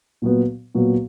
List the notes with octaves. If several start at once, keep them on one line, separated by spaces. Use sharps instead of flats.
A#2 F#3 B3
A#2 F#3 B3